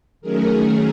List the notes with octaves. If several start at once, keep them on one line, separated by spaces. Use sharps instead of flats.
D#3 F#3 A3 C#4 G#4 A#4